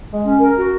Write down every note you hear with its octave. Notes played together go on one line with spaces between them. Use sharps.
G#3
C#4
A#4
F#4